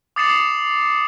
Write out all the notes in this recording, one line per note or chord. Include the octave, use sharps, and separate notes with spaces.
D6 D#6 A6 C7 C#7 E7